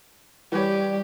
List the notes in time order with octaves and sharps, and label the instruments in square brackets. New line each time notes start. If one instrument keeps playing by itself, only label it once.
[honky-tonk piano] E3 B4 C#5 [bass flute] G3 [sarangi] G4